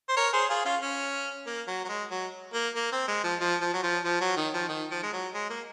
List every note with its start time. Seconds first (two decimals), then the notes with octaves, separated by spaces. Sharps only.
0.09 C5
0.17 A#4 C#5
0.33 G#4 C5
0.49 F4 G#4
0.65 C#4 F4
0.82 C#4
1.46 A#3
1.67 F#3
1.85 F#3
1.89 G#3
2.11 F#3
2.54 A#3
2.76 A#3
2.92 C4
3.08 G#3
3.24 F3
3.40 F3
3.61 F3
3.74 F#3
3.83 F3
4.04 F3
4.21 F#3
4.37 D#3
4.54 F3
4.69 D#3
4.91 F3
5.03 G#3
5.13 F#3
5.34 G#3
5.50 A#3